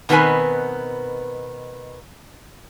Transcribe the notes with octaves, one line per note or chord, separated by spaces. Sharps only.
B2 D#3 B3 C4 B4 G#5